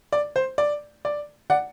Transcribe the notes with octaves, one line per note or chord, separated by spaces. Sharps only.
D5
C5
D5
D5
D5 F#5